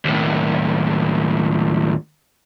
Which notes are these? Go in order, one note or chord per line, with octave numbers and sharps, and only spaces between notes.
D#2 A2